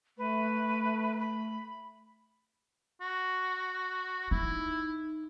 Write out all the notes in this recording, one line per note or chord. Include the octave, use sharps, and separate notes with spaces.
A3 B4
B5
F#4
D#4 E4